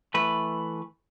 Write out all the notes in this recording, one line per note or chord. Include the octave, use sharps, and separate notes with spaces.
E3 A3 B4